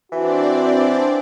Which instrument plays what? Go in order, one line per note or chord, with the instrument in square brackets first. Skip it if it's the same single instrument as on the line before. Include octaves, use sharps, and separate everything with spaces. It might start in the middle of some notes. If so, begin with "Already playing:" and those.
[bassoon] E3 [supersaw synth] C4 D4 D5 [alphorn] F#4